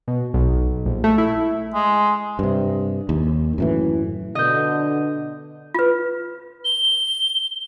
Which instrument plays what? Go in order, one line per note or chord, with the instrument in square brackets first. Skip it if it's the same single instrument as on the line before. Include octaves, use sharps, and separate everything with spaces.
[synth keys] B2
B1
A#1
A3
E4
[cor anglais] G#3
[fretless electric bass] G2 C3
D#2
F#2 A2 E3
[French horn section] B2 D3 [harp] D#5 G6
[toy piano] F4 B4
[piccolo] G7